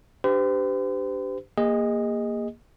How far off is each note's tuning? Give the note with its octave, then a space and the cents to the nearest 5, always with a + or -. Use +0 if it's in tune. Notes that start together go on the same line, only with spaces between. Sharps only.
D4 +0 G4 +0 C5 -45
A#3 +0 G#4 -35 D#5 +0